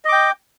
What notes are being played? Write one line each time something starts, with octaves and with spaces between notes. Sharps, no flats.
D#5 G5 D6